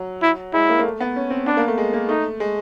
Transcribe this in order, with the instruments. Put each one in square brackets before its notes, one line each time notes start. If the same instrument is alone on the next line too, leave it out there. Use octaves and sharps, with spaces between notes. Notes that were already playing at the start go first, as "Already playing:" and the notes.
Already playing: [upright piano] F#3
[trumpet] E4
[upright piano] G#3 [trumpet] E4
[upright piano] A#3
A#3
A3
B3
C#4
C4
[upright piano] B3 [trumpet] D4
[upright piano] A#3
A3
G#3
A#3
[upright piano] A3 [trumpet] D#4
[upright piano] G#3